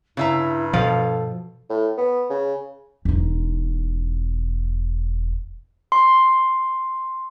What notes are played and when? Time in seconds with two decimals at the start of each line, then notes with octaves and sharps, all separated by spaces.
0.17 G2 C#3 E4 E5 A#5
0.73 B2 F3 A4 F5
1.70 A2
1.97 B3
2.30 C#3
3.05 E1 D#4
5.92 C6